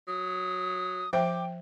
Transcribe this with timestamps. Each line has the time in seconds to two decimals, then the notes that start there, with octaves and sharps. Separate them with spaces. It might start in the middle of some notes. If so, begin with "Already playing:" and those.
0.08 F#3 D#6
1.13 F3 C5 E5 G5 D6